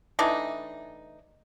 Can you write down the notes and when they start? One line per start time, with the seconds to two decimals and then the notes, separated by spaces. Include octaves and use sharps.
0.19 E3 A3 D4 D#4